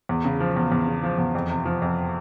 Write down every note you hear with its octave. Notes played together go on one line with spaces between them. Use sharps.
E2
C#3
F3
E2
E2
C#3
F3
E2
F2
C3
F3
F2